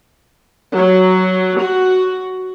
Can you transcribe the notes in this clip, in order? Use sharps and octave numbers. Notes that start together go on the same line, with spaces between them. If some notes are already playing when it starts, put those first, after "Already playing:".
F#3
F#4